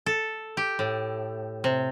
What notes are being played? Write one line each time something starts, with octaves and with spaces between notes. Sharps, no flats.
A4
G4
A2
C3